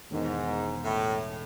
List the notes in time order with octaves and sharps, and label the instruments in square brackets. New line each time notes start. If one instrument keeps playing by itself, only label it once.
[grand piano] E1 E2 D#3 [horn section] G#2
[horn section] A2